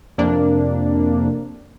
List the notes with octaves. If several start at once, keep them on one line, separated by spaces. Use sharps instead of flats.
F2 C3 A#3 D4